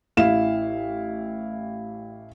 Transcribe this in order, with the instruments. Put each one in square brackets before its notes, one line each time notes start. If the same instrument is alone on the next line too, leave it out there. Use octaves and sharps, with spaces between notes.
[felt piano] A1 E4 F5 E7